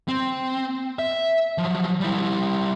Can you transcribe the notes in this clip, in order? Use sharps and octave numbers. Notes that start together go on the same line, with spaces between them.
C4
E5
F3 F#3
G3 E4